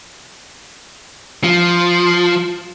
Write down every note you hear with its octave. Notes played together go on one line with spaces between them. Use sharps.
F3